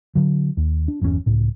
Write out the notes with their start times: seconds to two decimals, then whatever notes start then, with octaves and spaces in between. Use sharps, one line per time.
0.15 D3 F#3
0.57 D#2
0.88 D4
1.01 G1 E2 C#3 C#4
1.26 C#2 A2